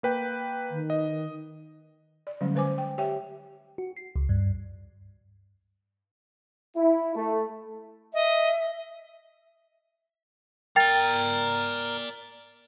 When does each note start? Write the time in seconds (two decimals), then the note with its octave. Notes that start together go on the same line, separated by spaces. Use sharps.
0.03 A#3 B4 G5
0.71 D#3
0.90 D#5
2.27 D5
2.41 D3 F#3 G3 A3 C#4
2.54 D3 G#3 B4 C5 G#5 D6
2.78 G5
2.98 G4 C#5 E5 G5
3.78 F#4
3.97 C7
4.16 C#2
4.29 G2
6.77 E4
7.16 A3
8.14 D#5 E5
10.76 A#4 D5 G5 A#5 A6